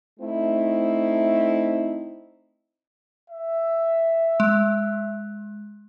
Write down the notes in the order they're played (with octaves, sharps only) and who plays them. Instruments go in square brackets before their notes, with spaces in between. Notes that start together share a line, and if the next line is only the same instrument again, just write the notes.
[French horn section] A3 C4 D#4 E4
[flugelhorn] E5
[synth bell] G#3